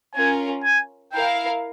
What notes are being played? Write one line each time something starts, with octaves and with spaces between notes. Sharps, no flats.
C#4 F4 A#4 G#5
G#5
E4 A#4 F5 G5